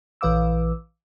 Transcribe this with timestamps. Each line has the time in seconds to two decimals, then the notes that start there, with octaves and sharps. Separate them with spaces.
0.21 A#1 E3 B4 F5 D6 E6